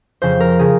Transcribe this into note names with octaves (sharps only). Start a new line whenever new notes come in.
F2 C#3 F3 C5
A#4
C#3 F3 G#4